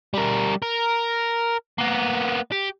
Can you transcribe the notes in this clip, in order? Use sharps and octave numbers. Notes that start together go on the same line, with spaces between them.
G3 A#4
A#4
A#3 B3
G4